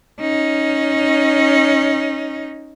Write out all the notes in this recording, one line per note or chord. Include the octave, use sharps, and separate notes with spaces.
C#4 D#4